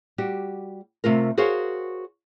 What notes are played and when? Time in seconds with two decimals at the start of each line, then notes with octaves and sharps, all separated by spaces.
0.18 G3 F#4 G4
1.04 C3 A3 F4 A#4
1.37 F#4 G#4 A#4 C5 C#5 F5